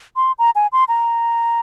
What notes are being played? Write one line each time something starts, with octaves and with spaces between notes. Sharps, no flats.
C6
A#5
G#5
C6
A#5